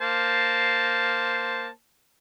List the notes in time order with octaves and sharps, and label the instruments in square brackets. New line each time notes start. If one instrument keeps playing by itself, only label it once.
[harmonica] A#3 C5 A5